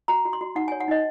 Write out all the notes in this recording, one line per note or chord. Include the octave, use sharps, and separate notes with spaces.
F#4 A#5
F#4
C6
F#4
D#4 F#5
G#5
C#5
F#5
D#4 D#5